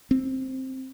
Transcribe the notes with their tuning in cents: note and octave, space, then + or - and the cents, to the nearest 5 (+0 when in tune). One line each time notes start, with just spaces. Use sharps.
C4 +5